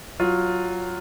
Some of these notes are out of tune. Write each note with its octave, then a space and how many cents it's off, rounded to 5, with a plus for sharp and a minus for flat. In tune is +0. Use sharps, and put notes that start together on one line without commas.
F#3 +0 F4 +10